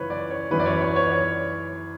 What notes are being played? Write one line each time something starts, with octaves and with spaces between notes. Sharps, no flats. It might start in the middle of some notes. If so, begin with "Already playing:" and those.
Already playing: F#2 C#3 E3 B4 C#5
D5
C#5
F#2 E3 B4
D5
C#5
B4
C#5
C#5
D5
C#5